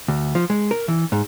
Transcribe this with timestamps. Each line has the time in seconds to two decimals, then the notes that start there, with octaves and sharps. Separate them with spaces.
0.08 D2
0.35 F3
0.50 G#3
0.71 A#4
0.88 E3
1.12 G#2